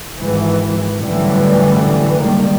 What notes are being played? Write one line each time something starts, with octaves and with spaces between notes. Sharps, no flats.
G#1 E3
F#2 A2 D3 E3 G3
C#2 D#3 G3 A#3